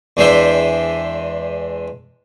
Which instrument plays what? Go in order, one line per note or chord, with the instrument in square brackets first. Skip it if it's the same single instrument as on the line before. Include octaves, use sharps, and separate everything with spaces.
[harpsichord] E2 G#3 D4 C5 E5 G5